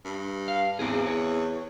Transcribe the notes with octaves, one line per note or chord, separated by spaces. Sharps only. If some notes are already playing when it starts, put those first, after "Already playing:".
G2
F5
E2 C4 G#4
C#5